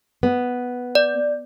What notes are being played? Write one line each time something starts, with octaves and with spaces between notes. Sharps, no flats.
B3
D5